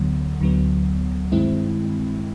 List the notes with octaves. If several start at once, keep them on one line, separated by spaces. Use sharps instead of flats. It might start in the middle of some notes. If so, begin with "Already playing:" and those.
Already playing: D2 D3 F#3 B3
D2 D3 F#3 B3
G2 D#3 G#3 C4 E4